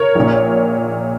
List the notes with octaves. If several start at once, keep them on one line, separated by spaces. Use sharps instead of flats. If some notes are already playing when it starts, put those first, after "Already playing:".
Already playing: A#4 C#5
A#1 A#2